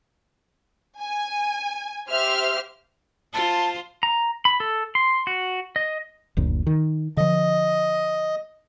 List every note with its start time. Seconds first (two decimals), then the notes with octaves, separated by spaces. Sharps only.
1.01 G#5
2.10 G4 C5 E5 F6
3.33 F4 C5 A5
4.03 A#5
4.45 B5
4.60 A4
4.95 C6
5.27 F#4
5.76 D#5
6.37 F#1 D2 A#2
6.67 D#3
7.17 D3 F3 D#5